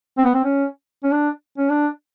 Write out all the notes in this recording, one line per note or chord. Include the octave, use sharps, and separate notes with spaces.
C4
B3
C4
C#4
C#4
D4
C#4
D4